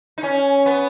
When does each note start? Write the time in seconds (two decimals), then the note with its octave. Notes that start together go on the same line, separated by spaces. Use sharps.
0.18 D#4
0.23 C#4
0.66 B3